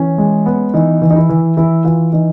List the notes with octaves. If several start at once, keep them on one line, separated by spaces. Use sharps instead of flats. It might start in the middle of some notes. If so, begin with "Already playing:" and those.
Already playing: E3 C#4
G#3
B3
E3 D#4
E3
D#4
E4
E3
E3 E4
E3 F4
E3 D#4